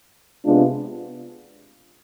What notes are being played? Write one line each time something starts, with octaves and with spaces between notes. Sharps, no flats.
C3 G#3 B3 D4 F4